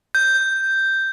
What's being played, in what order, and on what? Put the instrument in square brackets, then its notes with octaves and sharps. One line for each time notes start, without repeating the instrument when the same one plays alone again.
[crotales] G6